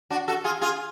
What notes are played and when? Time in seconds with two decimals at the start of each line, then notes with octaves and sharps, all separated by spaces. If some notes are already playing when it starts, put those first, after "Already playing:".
0.10 D4 F#4
0.28 F#4 A4
0.44 F4 G#4
0.61 F4 G#4